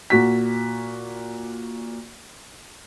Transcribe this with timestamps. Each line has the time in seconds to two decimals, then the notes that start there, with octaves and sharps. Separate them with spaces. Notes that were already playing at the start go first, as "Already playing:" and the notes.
0.10 A#2 F#4 B6